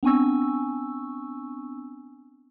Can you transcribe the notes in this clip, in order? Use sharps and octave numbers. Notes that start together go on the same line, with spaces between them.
B3 C4 D4 G#5 C#6 E6